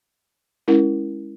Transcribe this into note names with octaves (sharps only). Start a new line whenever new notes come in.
G#3 C#4 E4 A#4